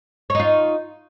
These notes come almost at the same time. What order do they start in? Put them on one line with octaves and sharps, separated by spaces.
C#5 D#4 F4